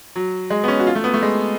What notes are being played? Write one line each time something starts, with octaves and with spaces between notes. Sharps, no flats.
F#3
G#3
B3
C#4
F#4
F4
A3
B3
A3
G#3